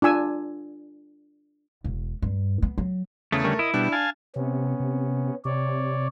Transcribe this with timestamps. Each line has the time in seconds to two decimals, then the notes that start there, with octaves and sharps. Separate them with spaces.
0.02 D4 F4 G#5 E6
1.84 E1
2.22 G2
2.62 B3
2.78 F#3
3.32 E2 C#3 A3 G#4
3.44 D3 G3 C#4 A#4
3.59 E4 D#5
3.74 B2 G3 D4
3.92 F5 G#5 A5
4.36 C3 B3 C#4
4.80 C3
5.45 C3 C#5 D5